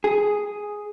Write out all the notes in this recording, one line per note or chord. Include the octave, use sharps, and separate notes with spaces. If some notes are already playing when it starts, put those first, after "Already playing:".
G#4